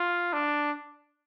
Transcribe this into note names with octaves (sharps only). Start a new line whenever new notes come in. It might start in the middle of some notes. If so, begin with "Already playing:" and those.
Already playing: F4
D4